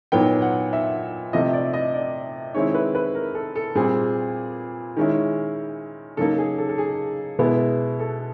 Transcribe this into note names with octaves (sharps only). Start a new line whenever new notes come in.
A#2 F#3 B3 D#4 G5
F#5
E5
C3 F3 A3 D#5
D5
D#5
D5
D#3 G#3 C4 E4 C#5
B4
B4
A#4
A4
A4
A#2 G3 C4 G#4
D#3 G#3 C#4 E4
C#3 F#3 A#3 D#4 A4
G#4
A4
A4
G#4
B2 G#3 B3 E4
A4